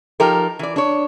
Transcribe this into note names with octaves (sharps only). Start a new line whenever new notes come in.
F3 D#4 G4 A4 A#4
E3 D5
D4 C#5